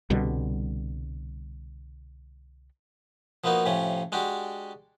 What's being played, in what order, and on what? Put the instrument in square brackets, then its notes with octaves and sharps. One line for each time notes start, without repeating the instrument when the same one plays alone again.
[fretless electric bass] C2 B2 D3 G3
[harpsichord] F3 A#3 B3 D#4 F#4
A2 C3 F3 C#4
G#3 D4 F#4 G4